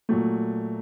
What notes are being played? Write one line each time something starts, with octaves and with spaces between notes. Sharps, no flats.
A#2 F#3 A3